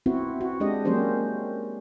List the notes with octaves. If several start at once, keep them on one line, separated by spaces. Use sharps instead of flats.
B3 C4 E4 F#4
F#4
G#3 D4 G4 D#5
F#3 A#3 C#4 G4 C5